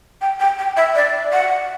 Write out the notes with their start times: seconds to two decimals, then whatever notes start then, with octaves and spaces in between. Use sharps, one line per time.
0.21 G5
0.40 G5
0.59 G5
0.77 E5
0.95 D5
1.33 F#5